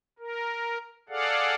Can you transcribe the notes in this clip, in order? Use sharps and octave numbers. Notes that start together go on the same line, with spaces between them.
A#4
G#4 A4 D5 F5 F#5